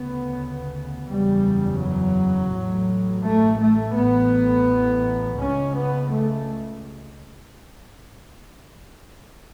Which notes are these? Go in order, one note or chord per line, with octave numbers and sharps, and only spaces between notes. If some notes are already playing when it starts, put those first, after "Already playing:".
Already playing: D2 C#3 B3
F#1 E2 C#3 G3
F#3
A1 A2
A3
A3
A1 A2 B3
C#2 C#3 C#4
B3
A3